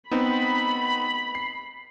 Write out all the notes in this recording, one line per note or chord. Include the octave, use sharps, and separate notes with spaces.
B3 C4 D#4 B5
C7